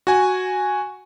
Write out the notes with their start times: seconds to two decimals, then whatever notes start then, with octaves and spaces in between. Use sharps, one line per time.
0.07 F#4 G#5